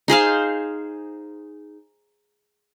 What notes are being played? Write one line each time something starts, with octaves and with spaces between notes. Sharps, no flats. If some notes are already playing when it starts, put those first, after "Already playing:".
D#4 G#4 C5 F5